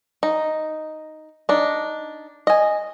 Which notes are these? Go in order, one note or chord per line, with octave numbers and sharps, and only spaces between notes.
D#4
D4 D#4
D#5 G#5